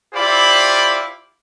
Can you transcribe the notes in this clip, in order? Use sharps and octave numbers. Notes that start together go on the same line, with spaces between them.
E4 F4 G4 C5 D5 B5